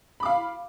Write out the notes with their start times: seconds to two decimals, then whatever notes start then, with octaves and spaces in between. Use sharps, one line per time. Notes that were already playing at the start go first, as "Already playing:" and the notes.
0.20 B5
0.23 D6
0.25 F5